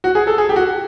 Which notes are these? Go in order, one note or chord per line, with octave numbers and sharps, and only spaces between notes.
F#4
G#4
A4
G#4
G4
F#4